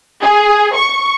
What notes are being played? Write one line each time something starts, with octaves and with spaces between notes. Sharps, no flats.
G#4
C#6